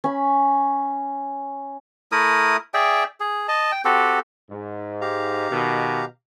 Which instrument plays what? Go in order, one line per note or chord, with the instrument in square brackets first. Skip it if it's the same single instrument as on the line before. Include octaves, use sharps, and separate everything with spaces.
[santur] C#4 B5
[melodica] A3 E4 A#4 D#6
G#4 D5 E5 G5
G#4
D#5 A5
G5
C4 F#4 G4 A4
[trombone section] G#2
[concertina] G4 F5 A#5
[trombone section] B2 D#3